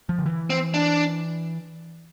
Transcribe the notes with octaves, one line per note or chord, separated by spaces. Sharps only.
F3
D3
E3
C4
D4